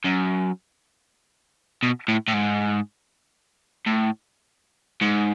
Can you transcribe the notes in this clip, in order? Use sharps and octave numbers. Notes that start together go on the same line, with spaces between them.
F#2
B2
A2
A2
G#2
A2
G#2